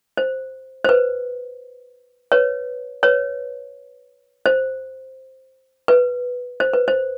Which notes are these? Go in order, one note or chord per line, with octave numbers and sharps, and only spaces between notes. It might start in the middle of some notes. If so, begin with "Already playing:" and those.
C5
C5
B4
B4 C#5
B4 C#5
C5
B4
C5
B4
C5